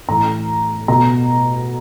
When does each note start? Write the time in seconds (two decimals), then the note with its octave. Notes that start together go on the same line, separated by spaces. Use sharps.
0.08 A2 E3 A#5
0.88 B2 A#5